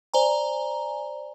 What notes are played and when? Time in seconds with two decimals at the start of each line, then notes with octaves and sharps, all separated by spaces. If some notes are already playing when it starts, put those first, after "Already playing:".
0.14 C5 D5 G#5 A#5